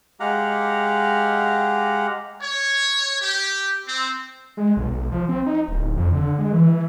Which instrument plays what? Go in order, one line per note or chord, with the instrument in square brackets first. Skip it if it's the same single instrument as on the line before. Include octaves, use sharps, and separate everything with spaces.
[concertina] G#3 G4 F5 F#5 A#5
[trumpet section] C#5
G4
C4
[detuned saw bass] G#3
B1
B1
F3
C4
D#4
D1
F2
D3
G#3
E3